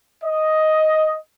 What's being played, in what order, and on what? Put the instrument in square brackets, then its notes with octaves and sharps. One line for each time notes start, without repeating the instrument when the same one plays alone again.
[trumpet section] D#5